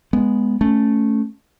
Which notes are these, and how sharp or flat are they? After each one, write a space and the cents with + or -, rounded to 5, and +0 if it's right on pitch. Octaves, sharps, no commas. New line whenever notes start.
G#3 +0 B3 +0
A3 +0 C#4 +0